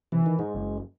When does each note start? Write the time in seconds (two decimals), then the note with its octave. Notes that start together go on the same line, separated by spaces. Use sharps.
0.12 C3 E3
0.26 D#3
0.39 G#2 G#3
0.54 F#1